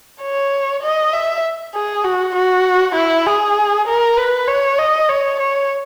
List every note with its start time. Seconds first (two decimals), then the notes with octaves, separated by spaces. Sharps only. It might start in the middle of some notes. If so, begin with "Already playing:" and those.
0.22 C#5
0.83 D#5
1.13 E5
1.74 G#4
2.04 F#4
2.35 F#4
2.95 E4
3.26 G#4
3.87 A#4
4.17 B4
4.48 C#5
4.78 D#5
5.09 C#5
5.39 C#5